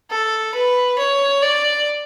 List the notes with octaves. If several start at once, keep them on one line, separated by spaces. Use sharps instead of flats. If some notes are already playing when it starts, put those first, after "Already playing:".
A4
B4
C#5
D5